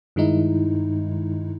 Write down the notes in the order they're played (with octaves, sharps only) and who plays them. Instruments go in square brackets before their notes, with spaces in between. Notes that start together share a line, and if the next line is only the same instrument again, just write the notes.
[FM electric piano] G2 D#3 G#3 D#4 E4